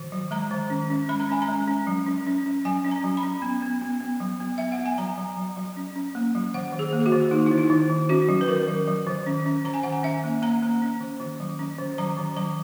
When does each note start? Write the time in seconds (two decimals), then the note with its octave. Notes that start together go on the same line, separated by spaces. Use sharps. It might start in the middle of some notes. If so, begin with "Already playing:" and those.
Already playing: D#3
0.12 F#3
0.31 G#3 A#5
0.51 D#3
0.70 C#4
0.90 C#4
1.09 G#3 B5
1.20 A#5
1.29 C#4 G#5
1.42 A#5
1.48 G#3
1.68 C#4
1.87 F#3
2.07 C#4
2.27 C#4
2.46 C#4
2.65 F#3 G#5
2.85 C#4
2.91 A#5
3.04 F#3
3.17 B5
3.23 C#4
3.42 B3
3.63 B3
3.81 B3
4.01 B3
4.20 F#3
4.40 B3
4.58 B3 E5
4.72 F#5
4.78 B3
4.86 G#5
4.98 F#3 A#5
5.17 F#3
5.37 F#3
5.57 F#3
5.77 C#4
5.96 C#4
6.15 A#3
6.35 F#3
6.54 D#3 F#5
6.73 D#3
6.79 G#4
6.93 A#3
7.00 G#4
7.06 F#4
7.12 D#3
7.31 A#3 D#4
7.46 E4
7.52 D#3
7.58 D#4
7.70 D#3
7.90 D#3
8.09 C#4 F#4
8.29 F#3
8.41 B4
8.48 D#3 A#4
8.68 F#3
8.88 F#3
9.07 D#3
9.26 C#4
9.46 C#4
9.65 D#3 A#5
9.74 G#5
9.83 D#3 F#5
9.92 G#5
10.03 C#4 E5
10.24 A#3
10.42 A#3 A#5
10.63 A#3
10.82 C#4
11.00 D#3
11.20 D#3
11.40 F#3
11.59 C#4
11.78 D#3
11.98 F#3 A#5
12.17 D#3
12.37 F#3 A#5